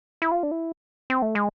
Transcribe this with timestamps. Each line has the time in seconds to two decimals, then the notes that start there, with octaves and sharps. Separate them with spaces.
0.22 E4
0.32 F4
0.43 D4
0.51 E4
1.10 C4
1.22 A3
1.35 G#3